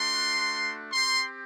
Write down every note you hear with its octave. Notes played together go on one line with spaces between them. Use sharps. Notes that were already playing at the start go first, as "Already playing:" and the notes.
Already playing: A3 D4 F#4 C6
C4 G4 C6